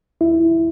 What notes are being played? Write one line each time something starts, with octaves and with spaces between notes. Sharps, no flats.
D#2 E4